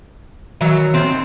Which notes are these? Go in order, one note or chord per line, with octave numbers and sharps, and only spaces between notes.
D#3 E3 F#3
D#2 C4